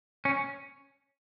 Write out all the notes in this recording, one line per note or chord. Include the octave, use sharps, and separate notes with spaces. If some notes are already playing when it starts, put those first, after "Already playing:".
C#4